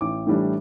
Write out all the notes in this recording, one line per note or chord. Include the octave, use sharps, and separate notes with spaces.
A1 D6
A2 E3 G3 D4